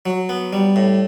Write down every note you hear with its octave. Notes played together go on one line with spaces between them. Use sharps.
F#3
B3
G3
A2